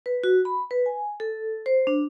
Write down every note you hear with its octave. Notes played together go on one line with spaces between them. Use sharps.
B4
F#4
B5
B4
G#5
A4
C5
D4